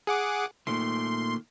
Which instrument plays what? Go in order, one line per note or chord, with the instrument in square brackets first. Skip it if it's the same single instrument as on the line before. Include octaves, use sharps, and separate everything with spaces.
[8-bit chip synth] G#4 F#5 D6
[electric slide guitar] A#2 D#3 A3 [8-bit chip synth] C6